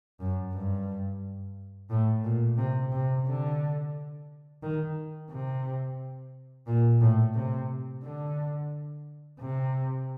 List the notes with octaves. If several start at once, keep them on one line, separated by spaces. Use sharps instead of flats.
F#2
G2
A2
A#2
C3
C3
D3
D#3
C3
A#2
A2
C3
D3
C3